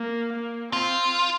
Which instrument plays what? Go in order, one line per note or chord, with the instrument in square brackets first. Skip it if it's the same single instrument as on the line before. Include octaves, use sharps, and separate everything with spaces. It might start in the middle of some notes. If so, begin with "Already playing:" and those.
Already playing: [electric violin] A#3
A#3
[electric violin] C4 [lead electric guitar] F4